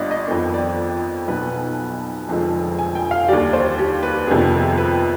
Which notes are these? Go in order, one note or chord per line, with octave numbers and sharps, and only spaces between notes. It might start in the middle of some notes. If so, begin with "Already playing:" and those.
Already playing: G1 G2 B3 D5 D#5
D#5
F2 D#3 B3
D5
B1 B2 B3 B4
F1 F2 D3 F3 G#3
G#5
G5
F5
D#2 D3 G3 D5
C5
G4
B4
F2 C3 D#3 G3 B3 G#4
B4